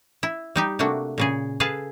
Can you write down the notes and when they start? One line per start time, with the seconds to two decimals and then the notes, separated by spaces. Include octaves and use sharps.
0.23 E4
0.56 G3 D#4 G4
0.79 C3 A3 A#3 D4 F#4
1.18 A#2 C#3 G#4
1.60 G#4 A4 B4 F5 A5